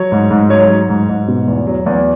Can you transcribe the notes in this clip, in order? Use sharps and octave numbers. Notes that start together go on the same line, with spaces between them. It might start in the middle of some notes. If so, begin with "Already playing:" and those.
Already playing: F#3 C#5
G#2
G#2
F#3 C#5
F#3
G#2
G#2
B2
E2
F#3
E2